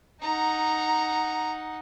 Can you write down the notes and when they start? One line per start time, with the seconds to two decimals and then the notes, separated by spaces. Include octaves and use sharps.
0.22 D#4 F#5 A#5